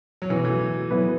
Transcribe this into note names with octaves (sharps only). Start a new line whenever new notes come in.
F#3
B2 E3 B3 F#4 B4
E3 A3
F#3 B3 E4 B4